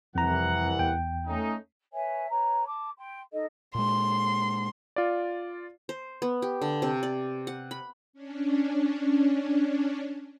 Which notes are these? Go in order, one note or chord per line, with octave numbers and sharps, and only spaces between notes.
C2 F2 E3 F#5 A#5
E2 G5
A3 C#4 D#4
B4 C#5 E5 G#5
B4 C#5 A#5
A5 D6
G5 C6
D#4 A4 D#5
A#2 G#3 C6
F4 D5
C5
B3
G4
D3
C3
D5
F#5
B5
C#4 D4